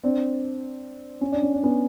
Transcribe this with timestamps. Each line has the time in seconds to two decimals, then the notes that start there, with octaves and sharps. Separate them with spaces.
0.04 C4 D4
1.21 C#4
1.32 D4
1.42 C#4
1.54 D4
1.63 B3 C#4